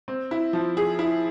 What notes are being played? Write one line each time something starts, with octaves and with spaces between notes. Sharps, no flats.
C4
E4
F3
G#4
E4